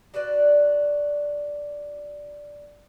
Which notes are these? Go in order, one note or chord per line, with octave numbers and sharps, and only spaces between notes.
D4 F#4 B4 D5